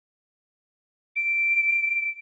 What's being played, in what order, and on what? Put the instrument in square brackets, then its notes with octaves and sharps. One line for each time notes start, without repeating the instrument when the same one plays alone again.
[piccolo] D7